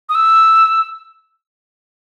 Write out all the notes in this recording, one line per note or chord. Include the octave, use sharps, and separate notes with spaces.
D#6
E6